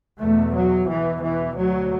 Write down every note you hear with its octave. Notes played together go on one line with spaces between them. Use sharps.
E2 B2 A3
F#3
E2 B2 E3
E3
D2 F#3